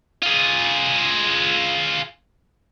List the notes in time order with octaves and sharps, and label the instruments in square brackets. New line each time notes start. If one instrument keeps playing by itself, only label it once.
[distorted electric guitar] F4 G#4